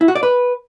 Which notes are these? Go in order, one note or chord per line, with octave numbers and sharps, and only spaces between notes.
E4
F#4
D5
B4